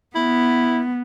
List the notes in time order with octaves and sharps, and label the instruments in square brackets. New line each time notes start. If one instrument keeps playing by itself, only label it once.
[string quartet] B3 [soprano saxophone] E4